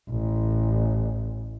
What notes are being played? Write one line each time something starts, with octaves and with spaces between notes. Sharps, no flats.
A1